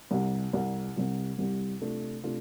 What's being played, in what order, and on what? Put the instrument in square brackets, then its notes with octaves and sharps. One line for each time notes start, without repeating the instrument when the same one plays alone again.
[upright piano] C2 C3 G3
C2 C3 G3
C2 C3 G3
C2 C3 G3
C3 A3 D4 F4
C3 A3 D4 F4